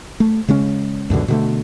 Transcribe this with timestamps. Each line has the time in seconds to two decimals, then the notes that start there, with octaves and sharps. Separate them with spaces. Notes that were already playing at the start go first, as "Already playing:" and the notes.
0.20 A3
0.48 C#3 G#3 C#4
1.10 C#2 F#2 B2 D3
1.28 B2 D3 A3